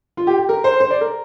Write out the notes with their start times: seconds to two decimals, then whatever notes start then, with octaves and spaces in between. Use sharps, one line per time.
0.17 F4
0.27 G4
0.38 G4
0.49 A#4
0.64 C5
0.80 C5
0.91 D5
1.01 A#4